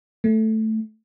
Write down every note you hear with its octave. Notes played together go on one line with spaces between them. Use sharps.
A3